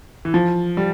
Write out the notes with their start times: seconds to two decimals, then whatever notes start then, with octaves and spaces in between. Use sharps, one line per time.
0.25 E3
0.34 F3
0.77 G3